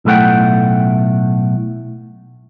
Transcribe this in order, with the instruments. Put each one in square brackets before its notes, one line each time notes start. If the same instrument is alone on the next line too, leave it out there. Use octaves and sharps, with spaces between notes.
[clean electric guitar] B1 A2 A3 A4 F#5 G5